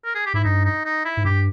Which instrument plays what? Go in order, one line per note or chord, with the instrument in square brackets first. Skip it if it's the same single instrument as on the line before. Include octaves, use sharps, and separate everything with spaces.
[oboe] A#4
G#4
G4
[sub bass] G#2 [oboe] E4
[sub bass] G2 [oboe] D#4
[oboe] D#4
D#4
E4
[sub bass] G#2
[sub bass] G2 [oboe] G4